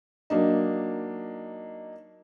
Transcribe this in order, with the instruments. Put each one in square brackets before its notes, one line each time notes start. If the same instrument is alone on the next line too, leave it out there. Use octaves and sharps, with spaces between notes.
[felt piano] F#3 A#3 D4 D#4